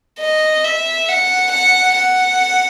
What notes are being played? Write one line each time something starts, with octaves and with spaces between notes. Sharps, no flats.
D#5
E5
F#5
F#5
F#5